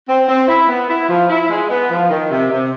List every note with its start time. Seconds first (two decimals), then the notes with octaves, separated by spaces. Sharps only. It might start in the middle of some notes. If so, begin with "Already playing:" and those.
0.08 C4
0.29 C4
0.48 E4
0.68 B3
0.89 E4
1.09 F3
1.29 E4
1.50 G#3
1.70 B3
1.90 F3
2.10 D#3
2.30 C3
2.51 C3